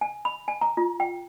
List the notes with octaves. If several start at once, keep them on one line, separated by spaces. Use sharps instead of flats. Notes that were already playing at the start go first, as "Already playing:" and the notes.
G#5
B5
G#5
A#5
F4
G5